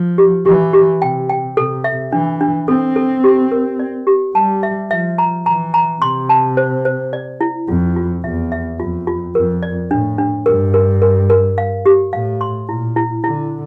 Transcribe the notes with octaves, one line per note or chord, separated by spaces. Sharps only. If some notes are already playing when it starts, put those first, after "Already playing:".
Already playing: F3
G4
E3 G4
G4
C3 G5
G5
C3 A4
E5
E3 D4
D4
C4 A4
A4
G4
A#4
D5
G4
G3 A5
E5
F3 E5
A#5
E3 A#5
A#5
C3 C6
A5
C5
C5
D5
E4
F2 F4
F4
E2 E5
E5
F2 F4
F4
F2 A#4
D5
A2 D4
D4
G2 A#4
A#4
A#4
A#4
F5
G4
A2 F5
C6
A#2 E4
E4
D3 E4